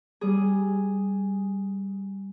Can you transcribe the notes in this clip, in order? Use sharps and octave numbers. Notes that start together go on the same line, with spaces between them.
G3 G#4